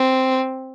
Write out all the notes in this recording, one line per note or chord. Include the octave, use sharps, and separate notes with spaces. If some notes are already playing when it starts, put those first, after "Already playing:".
Already playing: C4